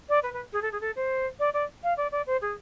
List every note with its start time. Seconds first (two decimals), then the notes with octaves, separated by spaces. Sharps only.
0.09 D5
0.23 B4
0.33 B4
0.53 G#4
0.62 A4
0.72 G#4
0.81 A4
0.96 C5
1.39 D5
1.53 D5
1.83 F5
1.97 D5
2.12 D5
2.26 C5
2.41 G#4